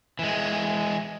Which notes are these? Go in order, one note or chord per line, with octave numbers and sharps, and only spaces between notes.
E3 G#3